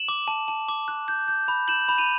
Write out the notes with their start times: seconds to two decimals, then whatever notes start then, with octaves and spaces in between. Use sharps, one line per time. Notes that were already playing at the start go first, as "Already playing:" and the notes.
Already playing: E7 F#7
0.08 D6
0.28 A5
0.48 A5
0.68 D6
0.88 F#6
1.08 G6
1.28 G6
1.48 B5
1.68 G6 E7 F#7
1.89 B5
1.98 D#7 F7